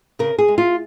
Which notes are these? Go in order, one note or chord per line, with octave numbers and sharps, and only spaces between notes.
C#3 A#4
G#4
G#3
F4